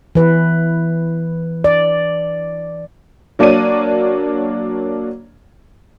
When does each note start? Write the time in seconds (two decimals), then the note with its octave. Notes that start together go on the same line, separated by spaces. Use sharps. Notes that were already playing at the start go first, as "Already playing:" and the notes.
0.15 E3 B4
1.64 D5
3.39 F#3 A#3 D4 C#5 D5 D#7